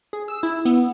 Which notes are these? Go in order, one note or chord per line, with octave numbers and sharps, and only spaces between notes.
G#4
E6
E4
B3